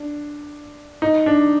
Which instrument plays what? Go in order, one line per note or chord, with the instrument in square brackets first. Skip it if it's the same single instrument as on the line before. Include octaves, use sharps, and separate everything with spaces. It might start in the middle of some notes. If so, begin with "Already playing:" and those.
Already playing: [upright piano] D4
D#4
D4